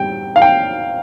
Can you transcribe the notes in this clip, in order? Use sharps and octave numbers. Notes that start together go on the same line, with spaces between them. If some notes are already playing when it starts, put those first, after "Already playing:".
Already playing: G3 G5
F5
G5